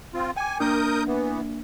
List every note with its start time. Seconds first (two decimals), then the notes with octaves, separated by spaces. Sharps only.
0.14 C4 F4
0.36 G5 G#5 D6
0.60 A#3 D4 A#4 D#6 G6
1.07 E3 B3